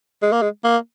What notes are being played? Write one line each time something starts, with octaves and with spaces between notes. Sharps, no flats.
G#3
A#3
G#3
A#3